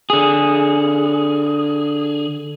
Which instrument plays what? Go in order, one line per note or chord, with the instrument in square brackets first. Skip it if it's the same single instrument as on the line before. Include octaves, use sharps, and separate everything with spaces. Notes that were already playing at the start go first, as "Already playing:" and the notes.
[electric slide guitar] D3 G#4